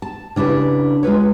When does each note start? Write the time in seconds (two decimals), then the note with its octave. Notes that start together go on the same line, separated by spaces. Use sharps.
0.02 A5
0.36 C#3 D4 E4 G4 B4
1.03 G#3 F4 B4 C#5